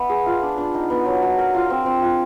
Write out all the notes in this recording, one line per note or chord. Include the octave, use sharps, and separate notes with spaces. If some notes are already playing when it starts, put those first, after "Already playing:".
Already playing: B3 E4 B4
G#4
F4
D4
D4
D#4
B3
F#3
F#3
A#4
F4
C4
C4
F4